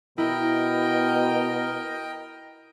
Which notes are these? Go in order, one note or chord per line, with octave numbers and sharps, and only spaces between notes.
B2 E4 A#4 D#5 G5